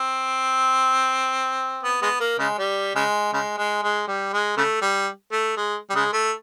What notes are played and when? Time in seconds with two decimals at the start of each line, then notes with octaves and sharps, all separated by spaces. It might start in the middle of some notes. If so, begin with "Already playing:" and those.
Already playing: C4
1.83 B3
2.02 G#3 B3
2.20 A#3
2.39 C#3 G#3
2.58 G3
2.95 C#3 G#3
3.33 C#3 G#3
3.58 G#3
3.83 G#3
4.08 G3
4.33 G#3
4.57 C#3 A3
4.82 G3
5.32 A3
5.57 G#3
5.90 G3
5.95 C#3 G#3
6.13 A3